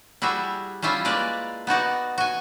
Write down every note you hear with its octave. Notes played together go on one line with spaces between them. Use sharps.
G3 E4 F#4 G#4 E5
G3 C#4 E4 F4 E5
G#3 A#3 B4 D5
B3 D#4 F#4 D5
F#4 G#5